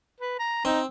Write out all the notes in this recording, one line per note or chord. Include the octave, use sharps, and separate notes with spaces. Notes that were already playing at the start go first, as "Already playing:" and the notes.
B4
A#5
C4 D#4